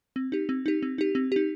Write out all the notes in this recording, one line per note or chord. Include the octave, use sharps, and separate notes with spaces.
C4
D#4 G4
C4
D#4 G4
C4
D#4 G4
C4
D#4 G4